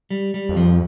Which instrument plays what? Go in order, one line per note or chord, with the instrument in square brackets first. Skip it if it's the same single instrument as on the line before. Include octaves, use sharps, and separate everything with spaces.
[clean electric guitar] G3
G3
[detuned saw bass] F2
[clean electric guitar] F3